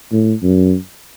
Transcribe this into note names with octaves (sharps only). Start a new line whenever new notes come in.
A2
F#2